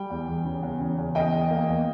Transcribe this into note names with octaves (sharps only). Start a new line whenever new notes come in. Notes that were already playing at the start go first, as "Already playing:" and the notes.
Already playing: G3 G5
E2
E2
C#3
E2
C#3
E2
E2 D#5 G5
E2
A#3
E2